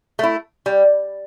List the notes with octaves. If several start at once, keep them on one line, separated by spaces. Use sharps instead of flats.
A3 E4
G3